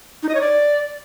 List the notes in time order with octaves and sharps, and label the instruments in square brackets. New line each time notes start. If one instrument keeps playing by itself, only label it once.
[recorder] D#4
D#5
C#5
D5